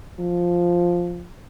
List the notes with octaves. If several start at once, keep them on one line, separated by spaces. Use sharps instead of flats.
F3